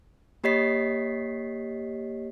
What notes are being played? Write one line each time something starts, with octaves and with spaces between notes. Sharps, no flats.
A#3 G4 C#5 D#5 B6 C7